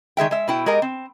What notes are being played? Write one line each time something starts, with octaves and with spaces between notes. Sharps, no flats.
D#3 G#3 E5 G5
G#3 E5
B2 E4 G5
G#3 G4 A#4 D#5
C4